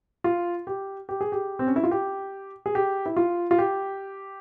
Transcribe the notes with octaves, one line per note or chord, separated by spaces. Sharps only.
F4
G4
G4
G#4
G4
C4
C#4
E4
F4
G4
G#4
G4
E4
F4
F4
G4